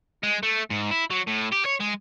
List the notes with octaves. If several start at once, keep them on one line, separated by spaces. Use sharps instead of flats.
G#3
A3
G#2
E4
F#3
A2
G4
C#5
G#3